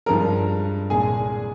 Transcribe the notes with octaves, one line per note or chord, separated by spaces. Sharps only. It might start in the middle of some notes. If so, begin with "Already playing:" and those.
G2 F3 G#3 A#4 A#5
C2 A#2 G#3 G#4 G#5